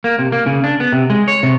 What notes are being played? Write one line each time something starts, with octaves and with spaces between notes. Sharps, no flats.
A#3
C3
A#3
C#3
D4
B3
C3
G#3
C#5
C3